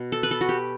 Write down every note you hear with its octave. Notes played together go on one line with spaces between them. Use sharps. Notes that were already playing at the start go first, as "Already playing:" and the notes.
Already playing: B2
A4
B4
A4
F#4
G4